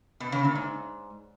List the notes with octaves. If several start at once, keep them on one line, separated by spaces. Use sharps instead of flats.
B2
C#3
A#2
G#2